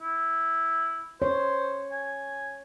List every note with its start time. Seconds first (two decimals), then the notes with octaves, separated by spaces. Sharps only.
0.01 E4
1.22 C5 C#5
1.92 G#5